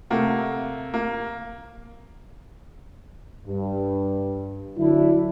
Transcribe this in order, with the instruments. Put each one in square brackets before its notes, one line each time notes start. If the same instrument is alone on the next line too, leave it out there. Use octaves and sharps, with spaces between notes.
[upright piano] C3 A3 A#3 F#5
A#3
[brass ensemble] G2
D3 F#3 D4 E4